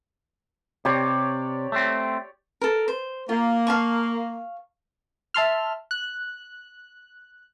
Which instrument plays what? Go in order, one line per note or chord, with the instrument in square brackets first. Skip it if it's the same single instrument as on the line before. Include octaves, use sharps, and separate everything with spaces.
[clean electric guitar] C3 [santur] G4 C#5 D5
[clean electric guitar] A3 C4
[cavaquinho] A4 A#4
C5
[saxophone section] A#3 [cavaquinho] F4
[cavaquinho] F5 A5 C#6
[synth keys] E5 A5 C6 F6
F#6